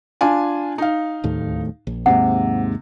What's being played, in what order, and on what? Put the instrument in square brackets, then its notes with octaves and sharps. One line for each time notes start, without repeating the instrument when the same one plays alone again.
[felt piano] D4 F4 G#5
D#4 F5
[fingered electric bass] D1 D#2 A2
A#1
[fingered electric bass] D#2 G#2 A#3 [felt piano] C3 [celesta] F#5